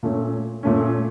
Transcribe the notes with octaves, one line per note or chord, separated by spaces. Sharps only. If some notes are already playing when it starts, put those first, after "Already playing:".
A#2 A3 C#4
A#2 A3 C#4